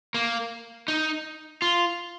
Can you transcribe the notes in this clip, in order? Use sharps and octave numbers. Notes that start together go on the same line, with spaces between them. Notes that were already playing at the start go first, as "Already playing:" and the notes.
A#3
D#4
F4